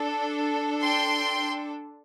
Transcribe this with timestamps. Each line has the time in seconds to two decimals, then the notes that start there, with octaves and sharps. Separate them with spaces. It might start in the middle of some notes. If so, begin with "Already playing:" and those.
Already playing: D4 A4
0.82 G5 C6